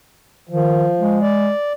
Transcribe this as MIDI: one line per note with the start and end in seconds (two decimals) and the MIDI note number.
0.49 0.88 51
0.49 1.19 53
0.99 1.50 56
1.22 1.73 74